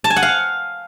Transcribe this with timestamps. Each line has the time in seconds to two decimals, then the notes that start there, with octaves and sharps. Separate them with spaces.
0.04 A5
0.10 G#5
0.16 F#5
0.22 F5